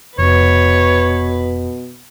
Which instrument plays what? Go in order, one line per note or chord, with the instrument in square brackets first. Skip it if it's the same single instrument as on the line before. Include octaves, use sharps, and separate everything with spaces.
[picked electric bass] F1 [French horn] B2 [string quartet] B4 [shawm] C#5